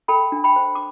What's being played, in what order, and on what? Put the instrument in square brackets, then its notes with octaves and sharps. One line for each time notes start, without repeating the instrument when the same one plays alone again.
[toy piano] A4 G5 B5
D4
G5 B5
C5
D6